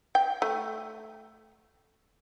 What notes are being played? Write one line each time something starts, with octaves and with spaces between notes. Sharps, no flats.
G5
A3